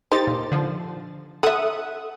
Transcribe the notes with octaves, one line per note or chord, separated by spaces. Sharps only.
D#4 G4 C5 A6
A#2
D3 F3
A4 E5 F#5 D#6